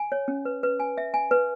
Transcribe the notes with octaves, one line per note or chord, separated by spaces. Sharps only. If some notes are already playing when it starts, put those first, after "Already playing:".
Already playing: G#5
C#5
C#4
B4
B4
G#5
E5
G#5
B4